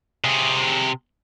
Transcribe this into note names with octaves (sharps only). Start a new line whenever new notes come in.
C3 G#4